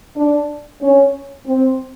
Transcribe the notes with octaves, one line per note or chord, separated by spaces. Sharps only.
D4
C#4
C4